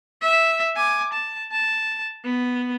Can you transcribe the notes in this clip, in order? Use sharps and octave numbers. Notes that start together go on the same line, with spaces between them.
E5
G#5 D6
A5
A5
B3